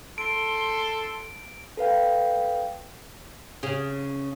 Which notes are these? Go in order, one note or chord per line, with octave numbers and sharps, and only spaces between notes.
A4 C6 D7
A4 B4 F5 G5
C#3